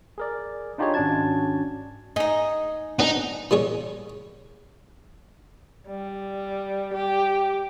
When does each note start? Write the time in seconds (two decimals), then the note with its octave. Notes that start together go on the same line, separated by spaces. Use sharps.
0.18 G#4 A#4 D5
0.78 D4 D#4 F4 G4 G#4 C#5
0.94 G#1 C#4 D4 F#4 A5 G#6
2.16 D#4 G#4 D#5
2.99 B3 D4 D#4 G#4
3.51 E3 G3 G#4 C#5
5.88 G3
6.93 G4